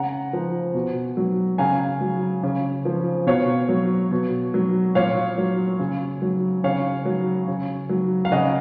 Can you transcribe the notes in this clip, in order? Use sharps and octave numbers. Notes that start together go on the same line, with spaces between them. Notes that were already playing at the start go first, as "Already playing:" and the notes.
Already playing: C#3 F#5 A#5
F3
B2
F#3
C#3 F5 G#5
F#3
C#3
F3
B2 C#5 F5
F#3
B2
F#3
A#2 C#5 F5
F#3
C#3
F#3
C#3 C#5 F5
F#3
C#3
F#3
F5
C#3 D#5 F#5